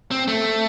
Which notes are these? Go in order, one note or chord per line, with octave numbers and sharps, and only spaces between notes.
C4
A3